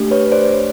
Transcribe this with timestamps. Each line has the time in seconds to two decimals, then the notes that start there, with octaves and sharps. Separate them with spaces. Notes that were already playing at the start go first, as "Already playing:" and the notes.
Already playing: A3 D4 G4
0.11 B4 C#5
0.32 C5 D5